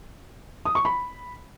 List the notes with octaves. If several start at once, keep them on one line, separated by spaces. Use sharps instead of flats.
D#6
C#6
B5